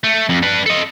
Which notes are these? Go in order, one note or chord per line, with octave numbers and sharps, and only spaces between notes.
A3
F2
D4 B4
A4 D#5